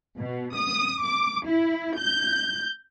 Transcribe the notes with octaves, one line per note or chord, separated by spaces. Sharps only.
B2
D#6
D6
E4
G6